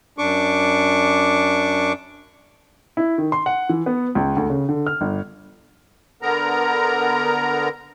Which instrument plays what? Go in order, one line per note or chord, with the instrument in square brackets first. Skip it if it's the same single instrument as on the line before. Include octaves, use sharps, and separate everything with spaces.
[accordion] F#2 D4 C#6 D6
[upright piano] E4
D#3
C6
F#5
E3
B3
C#2
D2
C#3
D3
F6
G1
[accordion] D3 B3 A#4 A#5